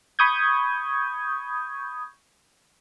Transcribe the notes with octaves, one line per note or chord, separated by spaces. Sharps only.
B5 C#6 D#6 G6 G#6